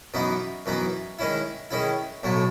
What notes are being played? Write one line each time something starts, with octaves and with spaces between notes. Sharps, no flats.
F#2 E3 B3 D#4
F#2 E3 B3 D#4
D#3 G#3 C#4 E4
D#3 G#3 C#4 E4
B1 A2 F#3 A3